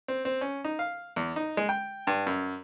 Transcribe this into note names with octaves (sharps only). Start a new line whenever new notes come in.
C4
C4
C#4
D#4
F5
E2
D#4
G#3
G5
G2
F#2